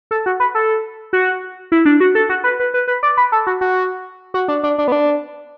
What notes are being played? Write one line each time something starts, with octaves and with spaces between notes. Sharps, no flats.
A4
F#4
B4
A4
F#4
E4
D4
F#4
A4
F#4
B4
B4
B4
B4
D5
B4
A4
F#4
F#4
F#4
D4
D4
D4
B3
D4